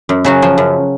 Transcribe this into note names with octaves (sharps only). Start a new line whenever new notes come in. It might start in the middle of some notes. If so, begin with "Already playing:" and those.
F#2
C#3 F#3 F#4
F3
F#2